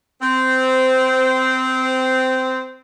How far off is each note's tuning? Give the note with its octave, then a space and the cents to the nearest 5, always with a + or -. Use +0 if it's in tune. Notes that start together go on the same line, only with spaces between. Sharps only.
C4 -15